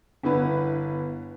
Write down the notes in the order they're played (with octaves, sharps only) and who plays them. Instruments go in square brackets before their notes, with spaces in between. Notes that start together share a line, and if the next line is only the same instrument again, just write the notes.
[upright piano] G1 B3 E4 B4